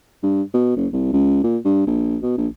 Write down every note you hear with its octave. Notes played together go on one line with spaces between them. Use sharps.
G2
B2
F#1
C2
C#2
A#2
G2
A#1
B2
A#1